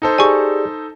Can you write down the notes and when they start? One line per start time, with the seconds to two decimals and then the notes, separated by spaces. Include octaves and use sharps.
0.02 D#4 A4 C5
0.18 G4 G#4 D5 G#5 C#6